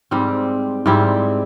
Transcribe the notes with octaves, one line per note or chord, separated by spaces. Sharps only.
G#2 G3 C4
G#2 G3 C4 E4